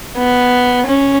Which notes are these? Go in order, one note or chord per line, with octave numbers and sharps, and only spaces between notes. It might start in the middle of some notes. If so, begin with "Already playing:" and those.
B3
C#4